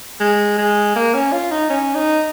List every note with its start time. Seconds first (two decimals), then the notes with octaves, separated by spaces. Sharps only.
0.20 G#3
0.58 G#3
0.96 A#3
1.14 C#4
1.32 F4
1.51 D#4
1.70 C#4
1.95 D#4